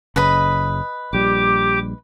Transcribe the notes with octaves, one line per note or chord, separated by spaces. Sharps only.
F#1 C#3 B4 D#5 B5
A#1 G3 G4 D6